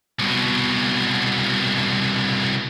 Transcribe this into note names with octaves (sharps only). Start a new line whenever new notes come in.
C2 B2